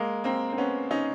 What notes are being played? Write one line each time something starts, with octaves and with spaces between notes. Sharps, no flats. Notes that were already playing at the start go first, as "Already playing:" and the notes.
Already playing: G#3 A#3
A#3 C4
C4
B3 C#4
C#4 D#4